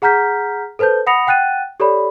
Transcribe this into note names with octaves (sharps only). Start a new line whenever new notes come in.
G#4 F#5 A#5 F6 G6 B6
A4 B4 C5 A5 G6
F#5 B5 D#6 A#6 C#7 F7
F#5 G5 F#6 A6 D#7
G4 A4 C#5 D5 B5